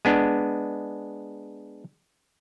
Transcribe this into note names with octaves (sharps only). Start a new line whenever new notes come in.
G#3 B3 D4